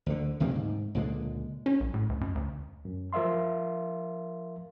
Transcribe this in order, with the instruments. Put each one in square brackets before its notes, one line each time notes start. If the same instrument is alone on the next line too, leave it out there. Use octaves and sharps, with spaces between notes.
[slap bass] D2 D3
D2 C3 D#3 A#3
G#2
C#2 A#2 D3 G#3
[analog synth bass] C#4
B1
A2
D2
F#2
D2
[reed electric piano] F#2
F3 A#4 E5 F5 C6